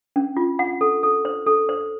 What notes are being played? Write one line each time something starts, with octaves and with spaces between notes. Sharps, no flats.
C#4
F4
F#5
A4
A4
C5
A4
C5